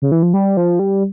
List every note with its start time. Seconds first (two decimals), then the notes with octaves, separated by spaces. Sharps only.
0.02 C#3
0.12 E3
0.23 F3
0.34 G3
0.57 F3
0.79 G3